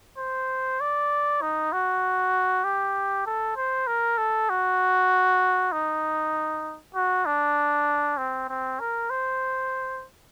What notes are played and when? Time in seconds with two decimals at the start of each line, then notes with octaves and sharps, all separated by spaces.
0.18 C5
0.81 D5
1.42 D#4
1.73 F#4
2.64 G4
3.26 A4
3.56 C5
3.87 A#4
4.18 A4
4.50 F#4
5.72 D#4
6.95 F#4
7.26 D4
8.18 C4
8.49 C4
8.80 A#4
9.10 C5